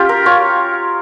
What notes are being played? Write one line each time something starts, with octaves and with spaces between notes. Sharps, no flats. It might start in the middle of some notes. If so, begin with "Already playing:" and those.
Already playing: C#4 F4 G4
A#4
F4 C#5